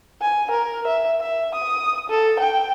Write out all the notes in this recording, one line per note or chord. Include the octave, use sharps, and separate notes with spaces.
G#5
A#4
E5
E5
D#6
A4
G5